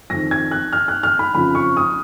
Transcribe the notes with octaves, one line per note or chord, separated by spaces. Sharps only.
F2 D#3 A#6
G#6
F#6
F6
F#6
F6
B5
F2 C#3 F3 B5
C#6
D#6